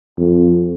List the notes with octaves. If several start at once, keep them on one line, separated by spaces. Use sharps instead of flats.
F2